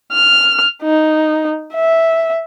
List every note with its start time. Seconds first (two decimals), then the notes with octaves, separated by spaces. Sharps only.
0.13 F6
0.83 D#4
1.74 E5